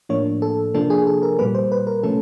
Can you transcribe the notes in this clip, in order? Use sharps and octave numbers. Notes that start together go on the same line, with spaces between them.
A2 F3 A#3 D4 C#5
A4
C3 F3 A#3 D4 A4
G#4
A4
A#4
A#2 G3 A#3 B4
C5
B4
A#4
C3 F3 A3 C#4 A4